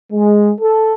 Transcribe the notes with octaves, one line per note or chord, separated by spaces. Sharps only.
G#3
A4